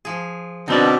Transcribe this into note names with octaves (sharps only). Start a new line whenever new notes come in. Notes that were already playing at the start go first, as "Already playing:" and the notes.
F3 G#4
B2 D3 C4 D4 D#4 D5